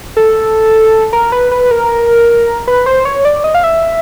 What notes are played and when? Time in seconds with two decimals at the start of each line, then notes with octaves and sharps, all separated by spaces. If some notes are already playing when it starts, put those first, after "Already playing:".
0.17 A4
1.13 A#4
1.32 B4
1.51 B4
1.71 A#4
2.67 B4
2.86 C5
3.05 C#5
3.25 D5
3.44 D#5
3.55 F5
3.63 E5